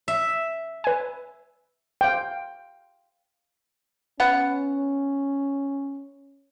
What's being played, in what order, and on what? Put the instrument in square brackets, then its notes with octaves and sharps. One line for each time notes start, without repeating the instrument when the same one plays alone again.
[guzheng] E5
[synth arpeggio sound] B4 G#5
[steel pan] F5 G5
[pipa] B3 F#5 [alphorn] C#4